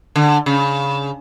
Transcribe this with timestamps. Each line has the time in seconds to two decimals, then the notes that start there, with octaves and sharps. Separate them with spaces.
0.16 D3
0.46 C#3